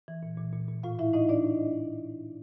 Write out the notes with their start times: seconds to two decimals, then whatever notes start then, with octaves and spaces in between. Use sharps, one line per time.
0.08 E3
0.23 A#2
0.38 A#2
0.53 A#2
0.68 A#2
0.83 A2 F4 F5
0.99 A2 E4 E5
1.13 A2 D#4 D#5
1.29 A2 D4 D5